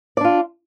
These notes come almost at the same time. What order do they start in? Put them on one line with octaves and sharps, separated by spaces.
D5 D4 F4